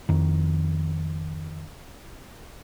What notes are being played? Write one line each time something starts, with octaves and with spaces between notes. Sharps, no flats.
F2 D#3